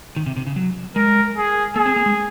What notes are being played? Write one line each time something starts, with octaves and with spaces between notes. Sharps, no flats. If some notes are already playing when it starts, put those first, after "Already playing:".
D#3
C3
C3
C#3
F#3
G#3 A#4
G#4
A#3 G#4
C4
A#3
G#3